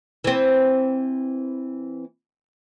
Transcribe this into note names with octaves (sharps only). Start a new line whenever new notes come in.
E3 C4